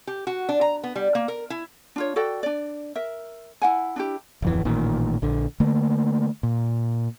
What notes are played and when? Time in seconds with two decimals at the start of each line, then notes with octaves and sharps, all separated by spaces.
0.07 G4
0.27 F#4
0.49 D4
0.61 A#5
0.83 B3
0.95 G3
1.15 A#3
1.28 A#4
1.50 E4
1.96 D4 F4 C#5
2.16 F#4 A4 D5 G5
2.43 D4 D5
2.96 A#4 E5
3.62 E4 F#5 G#5
3.96 D4 E4 G4
4.42 D1 F2 E3
4.65 A1 A#2 D#3
5.22 A#1 D3
5.60 D3 A3 A#3
6.43 A#2